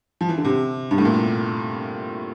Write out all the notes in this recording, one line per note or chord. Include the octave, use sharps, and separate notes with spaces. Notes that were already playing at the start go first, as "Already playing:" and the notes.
F3
E3
D3
C3
G2
A2
A#2